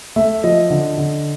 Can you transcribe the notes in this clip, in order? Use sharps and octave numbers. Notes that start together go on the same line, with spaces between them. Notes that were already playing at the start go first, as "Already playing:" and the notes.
A3 E5
F3 D#5
D3
D3